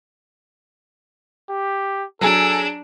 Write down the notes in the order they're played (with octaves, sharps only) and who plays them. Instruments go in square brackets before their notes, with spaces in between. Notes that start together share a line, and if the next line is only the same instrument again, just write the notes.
[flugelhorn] G4
[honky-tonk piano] F#3 G#4 [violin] D4 [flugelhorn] A4